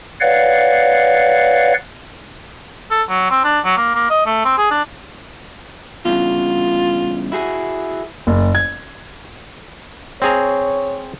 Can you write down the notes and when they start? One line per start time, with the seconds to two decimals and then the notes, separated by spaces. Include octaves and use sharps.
0.20 B4 C#5 D5 F5 F#5
2.91 A4
3.09 F#3
3.30 C4
3.44 D4
3.65 F#3
3.77 A#3
3.95 A#3
4.10 D#5
4.26 A3
4.45 C4
4.58 G#4
4.71 D4
6.05 E2 G2 C#3 F4
7.32 E4 F#4 G#4
8.27 F#1
8.55 G#6
10.22 C4 G#4 C#5 A#5